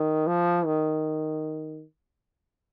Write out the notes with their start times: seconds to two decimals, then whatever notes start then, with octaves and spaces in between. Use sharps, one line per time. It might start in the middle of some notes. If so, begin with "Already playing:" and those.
Already playing: D#3
0.27 F3
0.66 D#3